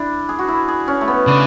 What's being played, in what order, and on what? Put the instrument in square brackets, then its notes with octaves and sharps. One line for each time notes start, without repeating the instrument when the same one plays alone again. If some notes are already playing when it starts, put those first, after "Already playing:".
Already playing: [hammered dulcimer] D4 E4
G#4
F#4
E4
G#4
C#4
A3
B3
[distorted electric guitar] C#3 [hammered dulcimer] D4